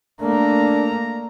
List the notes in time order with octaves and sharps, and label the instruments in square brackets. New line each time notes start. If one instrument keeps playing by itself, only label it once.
[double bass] A3 A#3 [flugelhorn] D4 [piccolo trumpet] A#5